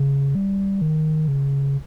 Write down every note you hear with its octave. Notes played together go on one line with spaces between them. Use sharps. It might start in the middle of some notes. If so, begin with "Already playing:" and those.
Already playing: C#3
G3
D#3
C#3